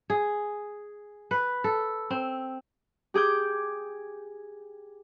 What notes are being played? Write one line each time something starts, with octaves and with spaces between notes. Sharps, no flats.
G#4
B4
A4
C4
G4 G#4 D6 G6